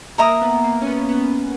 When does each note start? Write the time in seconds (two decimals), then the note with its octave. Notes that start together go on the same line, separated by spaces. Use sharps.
0.18 A#3 A#4 E5 A#5 D#6
0.41 B3
0.64 A#3
0.82 C#4
0.87 B3
1.09 B3